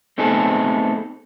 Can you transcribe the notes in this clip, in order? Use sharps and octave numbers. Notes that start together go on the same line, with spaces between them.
A3 B3 C4 D#4 G#4 A4